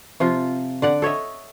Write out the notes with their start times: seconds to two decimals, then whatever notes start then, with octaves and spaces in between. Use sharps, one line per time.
0.20 C3 F3 F4
0.82 D3 D5 F#5
1.02 A4 C#5 D#5 E5